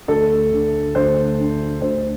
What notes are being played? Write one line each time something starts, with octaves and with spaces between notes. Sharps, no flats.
D2 A4
D3
D2 C5
D3
D2 C5